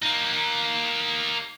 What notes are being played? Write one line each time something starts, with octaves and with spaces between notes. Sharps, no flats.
A#3 D#4